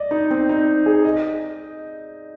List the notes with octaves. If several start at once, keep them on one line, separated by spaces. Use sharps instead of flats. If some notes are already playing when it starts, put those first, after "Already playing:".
Already playing: D5 D#5
D#4
C4
D#4
G#4
D#5